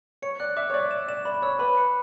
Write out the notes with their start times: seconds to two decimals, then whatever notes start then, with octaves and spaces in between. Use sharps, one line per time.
0.22 C#5 C#7
0.40 D5 F#6
0.57 E5 D6
0.70 C#5
0.74 D5 D6
0.91 E7
1.08 D5 E7
1.25 D5 B5
1.42 C#5 E6
1.59 B4 B5
1.77 C#7